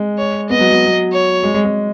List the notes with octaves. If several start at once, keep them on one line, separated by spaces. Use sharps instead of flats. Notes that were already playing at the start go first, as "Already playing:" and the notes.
Already playing: G#3
C#5
B3 D#5
F#3
F#3
F#3
C#5
G#3
G#3
G#3